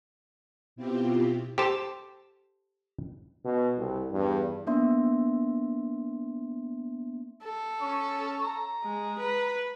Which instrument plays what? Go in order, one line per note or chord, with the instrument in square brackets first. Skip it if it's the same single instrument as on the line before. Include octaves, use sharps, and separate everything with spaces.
[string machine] B2 C4 E4 F4 G4
[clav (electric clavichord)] G4 A4 C5 A5
[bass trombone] B2
C2
[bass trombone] E2 [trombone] G2
[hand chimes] A#3 B3 D4 E5 C6
[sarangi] A4
[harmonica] C#4 C#6
A#5
[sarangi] G#3
B4